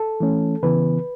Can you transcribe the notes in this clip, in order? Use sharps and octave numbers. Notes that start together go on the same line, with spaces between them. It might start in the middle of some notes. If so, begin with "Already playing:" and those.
Already playing: A4
E3 A3 C#4
C#3 E3 B3 B4